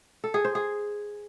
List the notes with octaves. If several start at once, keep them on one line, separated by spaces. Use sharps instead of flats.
A4
G#4
C5
G#4